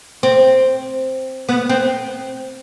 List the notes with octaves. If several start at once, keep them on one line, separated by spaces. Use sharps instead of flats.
C4
B3
C4